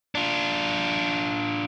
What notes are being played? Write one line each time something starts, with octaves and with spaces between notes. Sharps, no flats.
D4 F4